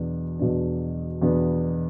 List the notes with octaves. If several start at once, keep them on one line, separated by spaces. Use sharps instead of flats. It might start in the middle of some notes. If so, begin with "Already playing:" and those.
Already playing: E2 B2 B3 D4
E2 B2 B3 D4
E2 B2 B3 D4